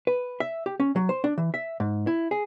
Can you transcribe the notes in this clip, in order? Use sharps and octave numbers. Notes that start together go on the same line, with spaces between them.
B4
E5
G4
C#4
F#3
C5
D4
E3
E5
G#2
E4
G#4